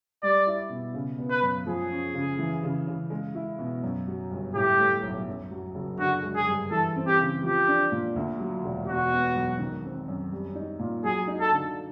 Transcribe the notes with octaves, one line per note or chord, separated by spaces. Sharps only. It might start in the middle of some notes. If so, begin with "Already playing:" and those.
G3 D5
E4
B2
C#3
B3
B4
F#2
F3 G#4
C#4
C#3
E3
C#3
C#3
G#3
E4
B2
F#2
F#3
G1
A2 G4
A3
B1
F#2
F#3
F#1
D3 F#4
G#3
G#4
G2
E3 A4
C4
G4
C#3
F3 G4
D4
A#2
D2
F#3
E1
B2 F#4
B3
B1
D#3
C4
F#2
G3
D#4
A#2
F#3 G#4
D#4
A4
D3